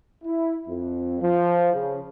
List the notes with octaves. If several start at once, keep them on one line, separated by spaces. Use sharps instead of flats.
E4
F2
F3
C#3